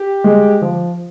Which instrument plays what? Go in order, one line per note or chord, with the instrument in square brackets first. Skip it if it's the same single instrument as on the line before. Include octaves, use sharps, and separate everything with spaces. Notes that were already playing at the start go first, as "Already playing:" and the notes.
Already playing: [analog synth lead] G4
[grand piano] G#3
F3